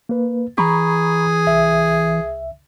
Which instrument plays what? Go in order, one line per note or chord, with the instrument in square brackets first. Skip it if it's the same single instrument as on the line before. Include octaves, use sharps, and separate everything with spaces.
[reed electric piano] A#3 B4
[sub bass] E3 [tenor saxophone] G#4 [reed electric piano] A#5 B5 C#6
[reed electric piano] C2 E5